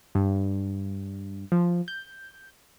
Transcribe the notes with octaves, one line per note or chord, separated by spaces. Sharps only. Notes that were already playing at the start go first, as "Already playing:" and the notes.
G2
F3
G6